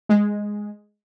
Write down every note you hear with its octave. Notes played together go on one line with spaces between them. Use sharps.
G#3